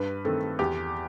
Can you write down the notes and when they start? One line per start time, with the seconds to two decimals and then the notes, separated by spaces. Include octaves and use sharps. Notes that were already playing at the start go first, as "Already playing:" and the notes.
Already playing: G2 B4
0.25 D#3 A3 C4 A4
0.59 E2 G4